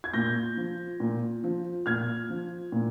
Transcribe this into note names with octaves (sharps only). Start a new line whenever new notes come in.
G#6
A#2 G6 A#6
F3
A#2
F3
A#2 F6 G#6
F3
A#2